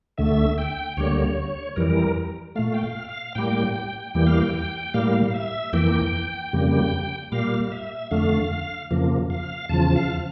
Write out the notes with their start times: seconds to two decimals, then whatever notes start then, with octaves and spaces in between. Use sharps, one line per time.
0.18 D2 D3 A3 E5
0.58 G5
0.97 D2 D3 G3 A#3 C#5
1.76 F2 E3 G3 A#4
2.56 A#2 A3 F5
2.74 G5
2.83 F5
3.09 F5
3.35 A2 G3 A#3 G5
3.76 G5
4.15 E2 E3 G3 A#3 G5
4.27 F5
4.40 G5
4.54 G5
4.94 A2 G3 A#3 F5
5.23 F5
5.34 E5
5.73 F2 E3 A#3 G5
6.53 F2 C#3 G3 A#3
7.32 A#2 G3 A#3 F5
7.72 E5
8.11 F2 D3 A3 F5
8.91 F2 C#3 F3 A#3
9.30 F5
9.69 E2 C#3 F3 A5
9.96 F5